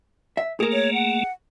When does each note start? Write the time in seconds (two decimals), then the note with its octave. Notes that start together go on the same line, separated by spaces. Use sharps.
0.37 E5
0.60 A3 A#3 G#4 A#4
0.73 C#5
0.94 F#5